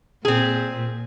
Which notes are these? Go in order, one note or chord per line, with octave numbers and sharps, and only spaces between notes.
A#2 C4 G#4